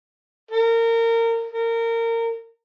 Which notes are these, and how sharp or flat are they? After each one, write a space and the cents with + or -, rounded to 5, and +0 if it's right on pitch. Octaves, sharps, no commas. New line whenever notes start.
A#4 -25
A#4 -25